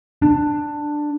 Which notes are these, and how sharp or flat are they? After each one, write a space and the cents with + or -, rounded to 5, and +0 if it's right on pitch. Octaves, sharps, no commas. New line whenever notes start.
D4 +10